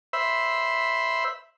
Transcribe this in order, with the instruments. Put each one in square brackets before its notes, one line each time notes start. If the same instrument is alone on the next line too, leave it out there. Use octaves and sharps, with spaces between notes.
[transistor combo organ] C5 E5 B5